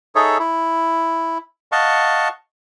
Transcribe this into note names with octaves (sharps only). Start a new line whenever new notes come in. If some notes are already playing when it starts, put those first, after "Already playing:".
D#4 G#4 A4 C#5 E5
E4
D#5 F5 F#5 A5 C#6